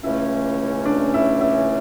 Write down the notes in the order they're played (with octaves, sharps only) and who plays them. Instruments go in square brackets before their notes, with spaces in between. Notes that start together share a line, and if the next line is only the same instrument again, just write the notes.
[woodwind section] C#2 C#3 E3 A3 C#4 [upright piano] E4
[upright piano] D4
E4
E4